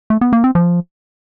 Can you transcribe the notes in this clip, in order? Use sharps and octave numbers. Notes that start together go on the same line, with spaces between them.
A3
B3
A#3
C4
F3